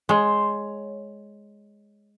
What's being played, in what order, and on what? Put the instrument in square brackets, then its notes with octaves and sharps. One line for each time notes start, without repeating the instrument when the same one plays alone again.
[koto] G#3 [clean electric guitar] C#5 C6